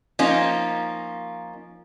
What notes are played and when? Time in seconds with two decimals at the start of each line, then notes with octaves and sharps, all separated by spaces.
0.19 F3 A#3 C#4 D#4